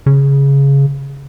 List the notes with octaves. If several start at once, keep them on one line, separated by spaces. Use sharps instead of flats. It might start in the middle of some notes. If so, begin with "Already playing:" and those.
C#3